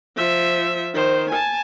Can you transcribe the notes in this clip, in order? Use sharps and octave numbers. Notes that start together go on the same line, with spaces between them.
F3 E5
D#3 C5
G#5 A5